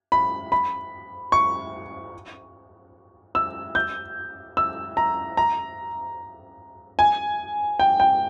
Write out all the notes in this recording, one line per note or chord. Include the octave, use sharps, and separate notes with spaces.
B5
B5
C#6
E6
G6
E6
A#5
A#5
G#5
G5
G5